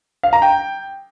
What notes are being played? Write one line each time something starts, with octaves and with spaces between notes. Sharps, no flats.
F5
A#5
G5